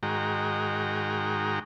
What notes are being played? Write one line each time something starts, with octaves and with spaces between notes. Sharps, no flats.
G#2 D#3 G#3 F#4 G5 A#5